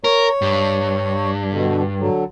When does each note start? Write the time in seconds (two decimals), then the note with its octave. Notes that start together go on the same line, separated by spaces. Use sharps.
0.04 A#4 C#5
0.42 G2
1.52 B2 D3
2.00 D3 F#3